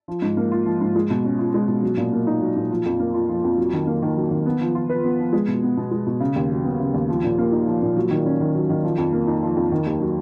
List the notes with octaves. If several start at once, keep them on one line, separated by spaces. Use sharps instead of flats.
F3
G#2
A#3
F4
F3
G#2
G#3
B2
C#4
F4
G#3
B2
F#3
A#2
A#3
D#4
F#3
A#2
F3
F2
A#3
F4
F3
F2
F#3
D#3
A#3
D#3
F#3
D#3
B3
F3
F4
B4
B3
F3
G#3
B2
B3
B2
G#3
B2
C#3
D#2
F#3
B3
C#3
D#2
F3
A#2
A#3
D#4
F3
A#2
F#3
D#3
C#4
D#3
F#3
D#3
F3
F2
A#3
D#4
F3
F2
D#3
D#2
F#3